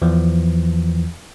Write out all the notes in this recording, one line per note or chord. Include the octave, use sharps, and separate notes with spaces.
E2 E3 F3